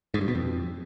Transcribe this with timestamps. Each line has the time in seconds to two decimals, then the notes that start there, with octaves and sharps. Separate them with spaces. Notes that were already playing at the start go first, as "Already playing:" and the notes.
0.14 G#2
0.21 G2
0.28 B2
0.35 F2